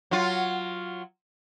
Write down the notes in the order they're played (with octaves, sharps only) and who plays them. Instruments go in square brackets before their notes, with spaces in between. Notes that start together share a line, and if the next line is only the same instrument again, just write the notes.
[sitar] F#3 F4